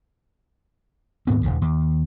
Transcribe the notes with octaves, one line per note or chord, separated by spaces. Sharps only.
D#2 G#2 B3 C4
D#1 A#1 D#2 C#3
D#2